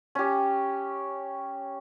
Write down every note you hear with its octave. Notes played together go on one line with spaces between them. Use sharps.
C#4 G4